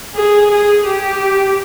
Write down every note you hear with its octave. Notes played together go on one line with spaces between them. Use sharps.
G#4
G#4
G4